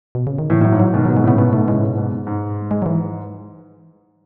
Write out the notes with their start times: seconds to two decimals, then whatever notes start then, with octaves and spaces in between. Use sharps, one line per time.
0.15 B2
0.27 C#3
0.39 D#3
0.50 A2 E3
0.61 A2 F#3
0.72 G#2
0.80 F#3
0.94 B2 D#3 G#3
1.05 G#2 B2 F#3
1.17 G#3
1.24 A2 C#3 B3
1.38 G#2 B2 B3
1.53 G#2 B2 A3
1.68 A2 C#3 G#3
1.82 G#2 B2
1.97 G#2 B2
2.12 G#2
2.27 G#2
2.71 G#3
2.82 F#3
2.86 E3